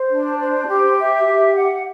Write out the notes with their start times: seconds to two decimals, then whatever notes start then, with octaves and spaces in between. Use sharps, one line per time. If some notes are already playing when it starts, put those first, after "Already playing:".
Already playing: C5
0.09 D4
0.38 C5
0.67 G4
0.97 E5
1.26 G4
1.54 F#5